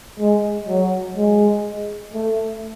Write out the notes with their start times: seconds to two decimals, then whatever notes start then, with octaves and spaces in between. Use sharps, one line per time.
0.19 G#3
0.68 F#3
1.17 G#3
2.14 A3